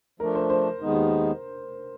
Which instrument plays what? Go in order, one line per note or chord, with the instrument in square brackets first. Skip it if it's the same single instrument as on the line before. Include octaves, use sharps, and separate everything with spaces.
[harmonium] F3 A3 D4 [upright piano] A#4
[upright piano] C5
C5
[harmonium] D#2 D#3 G#3 B3 D#4